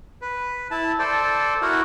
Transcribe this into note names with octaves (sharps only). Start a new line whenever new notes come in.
B4
E4 A5
A4 C5 D5
E4 F#4 A#4 F#5